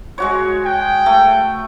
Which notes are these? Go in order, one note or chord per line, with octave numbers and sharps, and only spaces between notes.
G#3 F#4 C#5
G5
A3